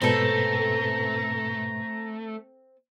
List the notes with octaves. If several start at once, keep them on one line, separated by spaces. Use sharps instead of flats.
G#2 B2 A3 C4 A4 B4 A#5